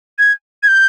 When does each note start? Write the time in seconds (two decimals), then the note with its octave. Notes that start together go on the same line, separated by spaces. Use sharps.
0.19 G#6
0.63 G#6
0.68 G6